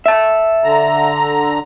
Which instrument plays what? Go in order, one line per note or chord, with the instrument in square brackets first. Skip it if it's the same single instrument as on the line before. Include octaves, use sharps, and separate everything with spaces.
[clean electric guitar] E5 A5
[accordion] D3 A#5